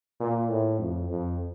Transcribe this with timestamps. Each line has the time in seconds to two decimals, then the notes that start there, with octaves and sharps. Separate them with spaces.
0.20 A#2
0.50 A2
0.80 F2
1.09 F2